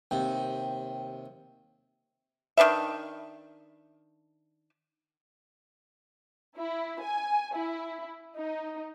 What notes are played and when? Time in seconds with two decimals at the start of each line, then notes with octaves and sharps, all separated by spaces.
0.11 D#2 C3 G5
2.57 D#3 D4 B4 E5
6.57 E4
7.02 G#5
7.55 E4
8.36 D#4